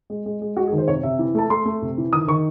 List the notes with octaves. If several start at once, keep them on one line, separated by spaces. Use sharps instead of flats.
G#3
G#3
G#3
G#3 F#4
G#4
D#3
C5
C3 C#5
C3 E5
E3
A3 A5
A3 C6
A3
C3
E3
D#3 D#6
D#3 C#6